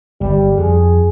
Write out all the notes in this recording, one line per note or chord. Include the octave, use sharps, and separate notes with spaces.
G1 G3
F2 G#4